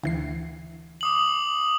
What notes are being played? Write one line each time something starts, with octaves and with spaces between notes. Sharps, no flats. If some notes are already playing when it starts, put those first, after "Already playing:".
D2 E3 C7
D6 D#6 F#7